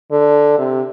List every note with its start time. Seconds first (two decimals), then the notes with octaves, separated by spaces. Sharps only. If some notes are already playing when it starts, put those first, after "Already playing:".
0.12 D3
0.58 C3